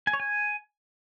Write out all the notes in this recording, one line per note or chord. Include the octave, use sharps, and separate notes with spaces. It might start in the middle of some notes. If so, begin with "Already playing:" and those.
G#5
C#5
G#5